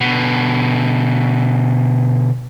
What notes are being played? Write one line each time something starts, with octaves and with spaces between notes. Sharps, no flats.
B2 D3